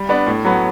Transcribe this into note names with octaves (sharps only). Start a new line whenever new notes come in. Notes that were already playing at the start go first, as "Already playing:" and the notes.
Already playing: G3
B3 D4
A2
F#3 B3